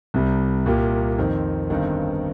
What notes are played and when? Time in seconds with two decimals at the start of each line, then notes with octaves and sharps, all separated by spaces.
0.14 C2 C3 G3
0.66 C2 A#2 A#3 G4
1.18 F2 D#3 C4
1.70 G1 G2 D#3 C4 D#4